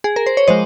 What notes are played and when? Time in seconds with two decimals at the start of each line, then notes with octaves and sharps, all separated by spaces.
0.04 G#4
0.16 A#4
0.26 C5
0.37 C#5
0.48 F3 G#3 C5 D#5